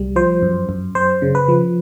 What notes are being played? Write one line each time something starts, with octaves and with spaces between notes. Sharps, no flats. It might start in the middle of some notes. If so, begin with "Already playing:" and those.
Already playing: C2 G3
F3 C5
F#2
F#2
F#2 C5
C#3
B4
F3